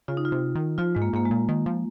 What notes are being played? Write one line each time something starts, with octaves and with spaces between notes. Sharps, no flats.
C#3 F4
D#4
F4
C3
D#3
F3 F4
G#2 G#3
A#3
G#2 A#3
G#3
A#2
D#3
F3